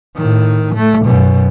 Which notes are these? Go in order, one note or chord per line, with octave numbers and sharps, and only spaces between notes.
A2 D#3
A3
F#2 B2